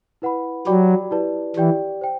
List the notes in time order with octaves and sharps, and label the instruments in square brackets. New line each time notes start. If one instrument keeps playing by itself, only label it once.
[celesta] E4 B4 F#5 B5
[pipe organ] F#3 [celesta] G4 D5 G5 B5 D6
[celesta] E4 G4 B4 D5 A5
[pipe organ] E3 [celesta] G4 D5 G5
[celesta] C5 G5